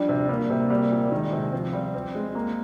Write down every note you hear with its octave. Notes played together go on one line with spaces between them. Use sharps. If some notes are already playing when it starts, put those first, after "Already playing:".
Already playing: F3 G3 D4
C3
G3 A#3
C3
G3
A#2
D#3 G#3
C3
F3 C4
G3
C4
G#3
A#3